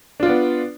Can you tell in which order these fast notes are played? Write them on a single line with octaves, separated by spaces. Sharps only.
D4 F4 D5 B3